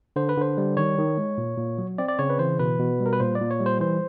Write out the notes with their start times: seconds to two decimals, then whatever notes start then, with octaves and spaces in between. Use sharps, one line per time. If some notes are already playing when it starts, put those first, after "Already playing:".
0.16 D3 C5
0.29 B4
0.37 D3 C5
0.57 G3
0.77 D#3 C#5
0.98 D#3
1.18 G#3
1.38 A#2
1.58 A#2
1.78 F#3
1.98 C4 D5
2.08 D5
2.19 C#3 C#5
2.30 B4
2.39 E3 C5
2.59 B2 B4
2.79 B2
3.00 G3
3.06 A#4
3.13 B4
3.20 A#2 C5
3.35 D5
3.41 A#2
3.51 C#5
3.61 G3
3.66 C5
3.80 E3 C5